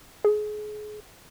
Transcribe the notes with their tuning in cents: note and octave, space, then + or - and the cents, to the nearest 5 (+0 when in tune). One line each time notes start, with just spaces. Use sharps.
G#4 +30